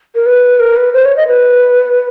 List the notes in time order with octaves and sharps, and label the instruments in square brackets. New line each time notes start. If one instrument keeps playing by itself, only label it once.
[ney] A#4
B4
A#4
B4
C5
C#5
D#5
B4